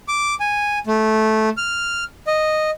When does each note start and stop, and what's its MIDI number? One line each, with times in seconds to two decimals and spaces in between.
0.08 0.34 86
0.40 0.79 80
0.87 1.49 57
1.57 2.04 89
2.27 2.70 75